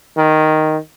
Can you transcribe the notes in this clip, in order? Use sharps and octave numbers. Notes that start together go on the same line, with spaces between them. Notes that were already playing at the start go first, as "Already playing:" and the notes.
D#3